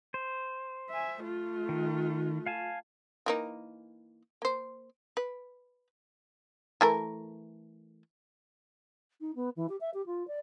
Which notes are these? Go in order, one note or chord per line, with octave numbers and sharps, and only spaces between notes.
C5
E5 G#5
A3 F4
D#3
F5 G#5 A5
E3 A#3 D#4
A#3 C5
B4
E3 A3 A#4
D#4
B3
E3
G4
E5
G4
F4
D5